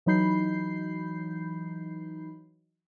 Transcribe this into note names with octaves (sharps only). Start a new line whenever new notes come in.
E3 F#3 D#4 B5 G6 C7